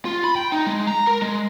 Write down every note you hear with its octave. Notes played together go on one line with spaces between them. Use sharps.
F4
B5
G5
D#4
G#3
A#5
A#4
G#3